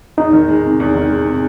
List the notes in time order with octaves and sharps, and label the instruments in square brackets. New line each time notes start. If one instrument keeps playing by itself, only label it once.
[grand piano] E2 [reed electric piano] D#4
[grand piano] D#3
G#3
C3
E2
D#3
G#3
C3